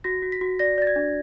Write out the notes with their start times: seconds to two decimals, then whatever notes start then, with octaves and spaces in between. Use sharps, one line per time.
0.04 F#4 A#6
0.22 F#4
0.32 B6
0.41 F#4
0.59 D5 A#6
0.78 D5 A6
0.87 G#6
0.96 D4